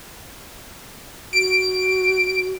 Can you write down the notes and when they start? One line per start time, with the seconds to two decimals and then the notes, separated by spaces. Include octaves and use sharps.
1.33 F#4 D7